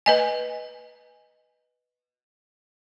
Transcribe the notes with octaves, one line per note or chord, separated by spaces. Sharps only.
B4 D#5 G#5